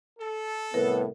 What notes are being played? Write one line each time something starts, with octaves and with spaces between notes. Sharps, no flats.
A4
C2 A2 B3 A#4 B4